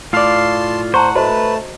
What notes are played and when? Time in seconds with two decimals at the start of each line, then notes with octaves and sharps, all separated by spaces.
0.13 A2 F4 D5 F5 A5 C6
0.94 C5 F#5 A5 A#5 C#6
1.15 A3 F#4 B4 C5 D#5 A5